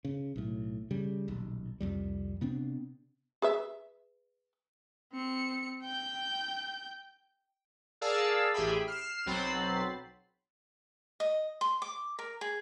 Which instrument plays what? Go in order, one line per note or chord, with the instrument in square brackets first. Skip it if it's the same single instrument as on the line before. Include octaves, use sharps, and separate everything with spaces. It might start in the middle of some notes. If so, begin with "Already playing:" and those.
[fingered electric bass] C#3
B1 A2
C#3 G3
D#1 B1
C2 F2 G3
C3 B3 C4 D4
[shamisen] G#4 B4 E5
[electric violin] C4 C#7
G5 G6
[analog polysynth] G#4 A#4 D5 F5 A5 E6
A1 G4 G#4 E5 G5 B5
F6 C7 E7
B1 F#3 C4 B5 A6 C7
[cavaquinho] D#5
C6
D6
A#4
G#4